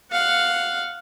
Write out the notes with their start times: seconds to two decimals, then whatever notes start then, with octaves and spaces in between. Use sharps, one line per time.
0.11 F5 F#5